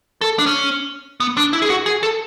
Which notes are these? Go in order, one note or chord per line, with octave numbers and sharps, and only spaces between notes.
A4
D4
C#4
B3
D4
E4
G#4
F#4
G#4
A4